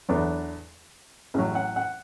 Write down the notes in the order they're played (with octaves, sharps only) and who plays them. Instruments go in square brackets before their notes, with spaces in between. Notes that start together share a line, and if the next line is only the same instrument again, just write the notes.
[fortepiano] E2 D3 F#3 B3 D4
A1 A2 F#3 G#4
F#5
F#5